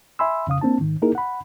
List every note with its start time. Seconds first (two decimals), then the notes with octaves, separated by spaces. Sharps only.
0.19 E5 G#5 B5 C6 E6
0.47 F2 C#3 F5 D#6
0.61 A#3 C4 D4 A5
0.80 G#2 D#3
1.02 A#3 D#4 E4 G#4 A#4
1.15 F#5 B5